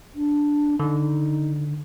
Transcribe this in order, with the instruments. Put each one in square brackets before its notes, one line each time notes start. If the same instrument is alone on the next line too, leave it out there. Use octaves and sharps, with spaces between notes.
[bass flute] D4
[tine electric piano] D3 [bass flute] D#4